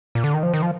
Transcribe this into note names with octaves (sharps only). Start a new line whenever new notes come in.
A#2
D3
D#3
F3
D#3
F3